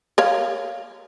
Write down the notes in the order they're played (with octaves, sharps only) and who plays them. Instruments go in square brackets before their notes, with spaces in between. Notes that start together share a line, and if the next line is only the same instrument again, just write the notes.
[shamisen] A#4 C#5 F5